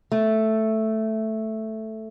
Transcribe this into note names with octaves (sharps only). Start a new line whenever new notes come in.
A3